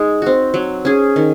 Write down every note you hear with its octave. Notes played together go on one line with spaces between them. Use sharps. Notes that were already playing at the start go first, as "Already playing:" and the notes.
Already playing: G#3 D#4
C4 F#4
F#3
C#4 G#4
D#3